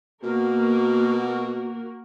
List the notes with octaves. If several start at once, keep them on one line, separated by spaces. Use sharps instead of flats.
B2 A#3 F#4 A#4